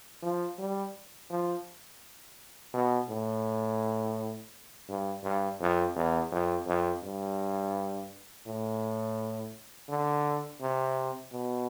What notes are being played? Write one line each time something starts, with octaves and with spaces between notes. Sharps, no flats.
F3
G3
F3
B2
A2
G2
G2
F2
E2
F2
F2
G2
A2
D3
C3
B2